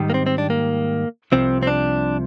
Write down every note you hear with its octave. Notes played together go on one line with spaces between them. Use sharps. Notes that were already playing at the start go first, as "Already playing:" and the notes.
Already playing: G#2 D#3 G3
A#3
C4
C4
D4
A#3
C2 C3 F3 C4
C4
D4